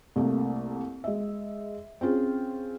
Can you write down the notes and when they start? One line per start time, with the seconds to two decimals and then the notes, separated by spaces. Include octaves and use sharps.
0.16 C2 A3 A#3
1.04 G#3 D#5 E5
2.01 C4 C#4 F4 G#4